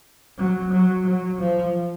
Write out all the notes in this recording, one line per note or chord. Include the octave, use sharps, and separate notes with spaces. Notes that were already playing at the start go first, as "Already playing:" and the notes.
F#3
F#3
F#3
F3